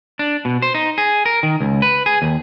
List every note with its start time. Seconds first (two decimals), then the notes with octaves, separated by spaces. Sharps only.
0.19 D4
0.45 B2
0.62 C5
0.75 D#4
0.98 G#4
1.26 A#4
1.43 D#3
1.61 C#2
1.82 B4
2.06 G#4
2.22 D#2